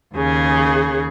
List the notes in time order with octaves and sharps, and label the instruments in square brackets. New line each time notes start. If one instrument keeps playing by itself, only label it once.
[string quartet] D#2 C#3 G#4